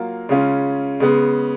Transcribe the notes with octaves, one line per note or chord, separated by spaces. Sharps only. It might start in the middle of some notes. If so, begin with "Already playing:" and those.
Already playing: F#3 A#3 F4
C#3 G#3 C#4 F4
C#3 G#3 B3